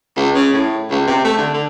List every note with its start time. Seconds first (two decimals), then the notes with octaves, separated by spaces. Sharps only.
0.16 C#2
0.35 C#3
0.54 A2
0.91 C#2
1.07 C3
1.25 A3
1.38 D3
1.54 D3